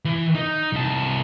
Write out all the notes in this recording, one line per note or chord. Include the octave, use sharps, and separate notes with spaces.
E3
D#4
C2 A5